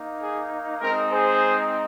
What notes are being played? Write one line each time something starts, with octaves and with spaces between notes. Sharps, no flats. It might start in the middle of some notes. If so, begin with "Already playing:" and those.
Already playing: A#3 D#4
G#4
G#3 C4 D#4 A#4
G#4 C5